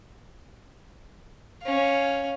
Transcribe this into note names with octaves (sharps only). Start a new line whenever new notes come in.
C#4 F5